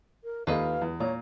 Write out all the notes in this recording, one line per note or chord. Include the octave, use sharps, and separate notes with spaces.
A#4
D#2 F4 A4 B4 D#5 F5
E2
A#2 C#5 A#5